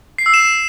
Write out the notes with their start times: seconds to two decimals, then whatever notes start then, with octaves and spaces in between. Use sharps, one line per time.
0.18 C7
0.26 E6
0.34 E7